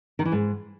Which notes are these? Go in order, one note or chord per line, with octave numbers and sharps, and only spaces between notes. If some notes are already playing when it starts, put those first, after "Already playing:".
D#3
E3
G#2